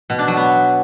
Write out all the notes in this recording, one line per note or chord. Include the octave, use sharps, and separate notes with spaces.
B2
D4
F#3
B3